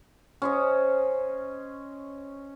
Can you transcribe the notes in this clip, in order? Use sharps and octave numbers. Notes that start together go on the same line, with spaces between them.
C#4 C5 D#5